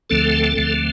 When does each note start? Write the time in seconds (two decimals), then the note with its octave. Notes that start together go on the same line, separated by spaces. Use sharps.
0.10 D2 D3 F3 A3 C4 A4
0.56 D2 D3 F3 A3 C4